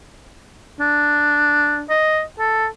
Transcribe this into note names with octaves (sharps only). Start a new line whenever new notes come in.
D4
D#5
A4